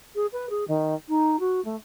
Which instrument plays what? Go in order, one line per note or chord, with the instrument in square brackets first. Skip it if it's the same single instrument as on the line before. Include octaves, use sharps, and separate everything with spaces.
[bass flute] G#4
B4
G#4
D#3
D#4
F#4
A3